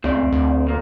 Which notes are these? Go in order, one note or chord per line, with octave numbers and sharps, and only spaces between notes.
C#2 A3 C4 D5
D2
A#2 A#3